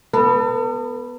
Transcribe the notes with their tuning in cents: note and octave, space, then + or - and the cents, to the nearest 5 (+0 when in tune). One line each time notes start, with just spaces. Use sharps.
B3 +0 A4 +45